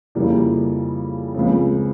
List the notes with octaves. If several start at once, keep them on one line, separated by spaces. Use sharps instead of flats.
F2 C#3 G3 A#3 E4
C#2 C#3 F3 C4